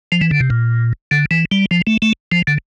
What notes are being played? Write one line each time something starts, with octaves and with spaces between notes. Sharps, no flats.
F3
E3
D3
C3
A#2
D3
E3
G3
F3
A3
A3
F3
D3